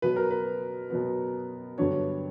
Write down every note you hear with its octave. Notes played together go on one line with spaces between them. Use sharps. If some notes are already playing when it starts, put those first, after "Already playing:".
B2 F#3 B3 B4
A#4
B4
B2 F#3 B3
G2 D3 F#3 B3 D4 C#5